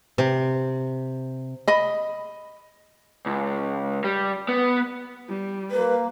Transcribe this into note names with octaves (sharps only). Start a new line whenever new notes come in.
C3
D#5 B5
C#2
G3
B3
G3
A#3 B4